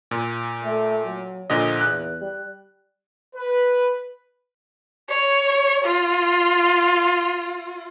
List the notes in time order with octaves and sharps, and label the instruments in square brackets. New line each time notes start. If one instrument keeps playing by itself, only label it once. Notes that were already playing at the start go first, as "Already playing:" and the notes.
[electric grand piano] A#2
[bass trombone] A3
F#3
[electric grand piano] A#2 D3 D#5 [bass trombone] F3
[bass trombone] E2 [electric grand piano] F#6
[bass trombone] G3
[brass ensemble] B4
[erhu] C#5
F4